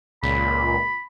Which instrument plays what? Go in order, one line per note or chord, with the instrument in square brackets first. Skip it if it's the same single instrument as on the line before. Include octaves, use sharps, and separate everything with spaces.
[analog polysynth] C#2 A#2 [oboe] B5